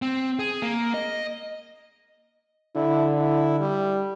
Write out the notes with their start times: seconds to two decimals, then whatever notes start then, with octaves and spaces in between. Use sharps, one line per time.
0.02 C4
0.39 G#4
0.62 A#3
0.94 D#5
2.75 D3 E4
3.19 E4
3.60 G3